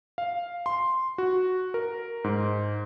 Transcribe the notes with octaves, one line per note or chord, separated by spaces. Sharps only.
F5
C6
F#4
A#4
G#2